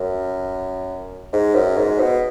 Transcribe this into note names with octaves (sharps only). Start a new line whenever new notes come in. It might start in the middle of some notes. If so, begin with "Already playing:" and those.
Already playing: F#2
G#2
F#2
G#2
B2